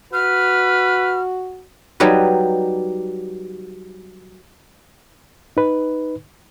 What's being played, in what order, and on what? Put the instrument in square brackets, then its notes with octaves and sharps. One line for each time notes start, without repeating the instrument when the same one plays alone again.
[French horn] F#4 [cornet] B4 [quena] F6
[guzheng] F#3 G3 D#4 B4
[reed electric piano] D#4 B4